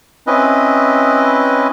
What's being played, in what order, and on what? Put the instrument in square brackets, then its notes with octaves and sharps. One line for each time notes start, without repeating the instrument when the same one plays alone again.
[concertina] C4 C#4 E4 B4 D#5